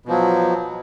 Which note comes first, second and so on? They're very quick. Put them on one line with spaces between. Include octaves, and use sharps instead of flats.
B2 F3 F#3